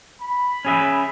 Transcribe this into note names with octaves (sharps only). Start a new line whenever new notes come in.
B5
C#4 G#4 E5